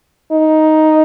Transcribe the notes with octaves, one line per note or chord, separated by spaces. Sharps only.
D#4